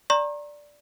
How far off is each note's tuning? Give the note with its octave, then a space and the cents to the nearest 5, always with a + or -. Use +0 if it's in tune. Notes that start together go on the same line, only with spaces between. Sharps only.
D5 +0 A#5 +0 C#6 -45